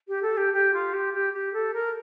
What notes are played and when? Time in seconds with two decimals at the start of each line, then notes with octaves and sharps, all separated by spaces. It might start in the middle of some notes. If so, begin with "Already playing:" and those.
0.08 G4
0.22 A4
0.37 G4
0.53 G4
0.74 F4
0.94 G4
1.13 G4
1.33 G4
1.53 A4
1.74 A#4